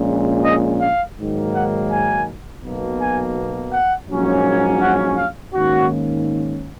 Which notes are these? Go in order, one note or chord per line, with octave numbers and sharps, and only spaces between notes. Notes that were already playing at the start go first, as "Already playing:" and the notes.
Already playing: A#1 A#2 G#3 C#4
D#5
F5
G#2 D#3 F#3 A#3
F#5
G#5
B1 B2 A#3
G#5
F#5
A#1 G#2 F#3 A#3 C#4
G#5
F#5
F5
G#2 D#3 A#3 C#4 F#4